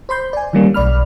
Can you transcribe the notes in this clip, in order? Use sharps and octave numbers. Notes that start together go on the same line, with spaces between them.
C5 B5 C6 G6
D5 G#5
D#3 E3 G3 A#3 C#4
B1 D5 B5 F6